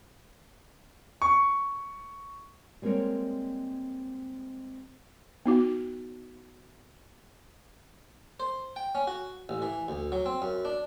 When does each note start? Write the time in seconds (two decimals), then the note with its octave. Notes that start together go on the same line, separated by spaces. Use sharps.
1.22 C#6
2.82 G3 G#3 A#3 C4 A#4 C#5
5.46 B3 D#4 F#4
8.40 C5
8.76 G5
8.95 C#4
9.07 F#4
9.49 A1
9.62 E3
9.88 D2
10.12 F#3
10.26 C4
10.42 F#2
10.65 D4